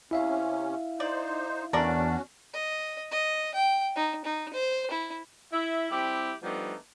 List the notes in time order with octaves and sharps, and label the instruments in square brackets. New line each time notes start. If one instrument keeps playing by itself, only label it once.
[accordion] C3 C#4 [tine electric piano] E4 E5 F5
[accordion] D#4 C5 [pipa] D5
[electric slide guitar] E2 D4 [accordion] C#4 F#4 [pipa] A4 A#4 D5
[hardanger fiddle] D#5
D#5
G5
D#4
D#4
C5
E4
[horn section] E4 E5
G3 C4 E4 G4
F3 G3 A3 B3 D4 D#4